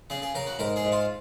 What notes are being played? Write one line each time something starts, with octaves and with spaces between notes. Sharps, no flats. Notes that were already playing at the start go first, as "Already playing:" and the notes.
C#3 G#4
G#4
C#3 A#4
F#4
G#2 A#4
G#4
G#2
F4